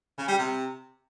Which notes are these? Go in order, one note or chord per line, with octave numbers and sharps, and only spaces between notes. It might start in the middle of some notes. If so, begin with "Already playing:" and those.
C#3
G3
C3